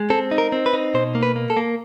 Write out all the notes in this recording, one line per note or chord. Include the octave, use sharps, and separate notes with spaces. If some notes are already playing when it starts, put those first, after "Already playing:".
Already playing: G#3
C4 A4
D#4
A#4
C4
B4
D#4
B2 C5
A#3
B4
A#3
A4
A#3